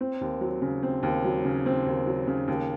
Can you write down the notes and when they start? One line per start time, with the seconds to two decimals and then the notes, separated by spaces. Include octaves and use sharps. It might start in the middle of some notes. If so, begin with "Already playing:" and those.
0.01 C4
0.21 D#2
0.41 F#3
0.62 C#3
0.83 C4
1.03 D#2
1.25 F#3
1.45 C#3
1.66 C4
1.86 D#2
2.07 F#3
2.27 C#3
2.48 D#2